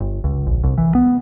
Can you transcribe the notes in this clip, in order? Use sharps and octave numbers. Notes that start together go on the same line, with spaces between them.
G1
C#2
A#1
C2
E3
B3